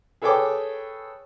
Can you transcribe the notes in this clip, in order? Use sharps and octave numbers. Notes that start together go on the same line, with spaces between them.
G#4 A4 B4 C#5 G5 D6